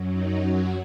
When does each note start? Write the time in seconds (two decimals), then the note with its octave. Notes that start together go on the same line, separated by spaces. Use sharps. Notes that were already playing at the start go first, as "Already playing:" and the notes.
Already playing: F#2 F#3
0.10 D#4
0.40 F#4